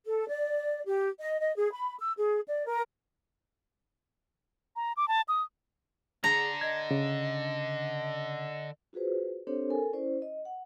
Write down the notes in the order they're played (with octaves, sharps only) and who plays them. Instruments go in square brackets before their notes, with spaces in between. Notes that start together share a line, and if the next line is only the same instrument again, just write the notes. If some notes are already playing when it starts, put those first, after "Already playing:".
[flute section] A4
D5
G4
D#5
D#5
G#4
B5
E6
G#4
D5
A#4
[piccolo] A#5
D6
A5
D#6
[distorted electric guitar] D3 [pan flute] G#4 [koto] A#5
[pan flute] D#5 [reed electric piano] G#6
[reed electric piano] C#3
[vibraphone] F4 F#4 G#4 B4 C5
C4 D4 G4 A4 C5 C#5
A4 A#4 G#5
C#4 E4 C5 D5
D#5
F#5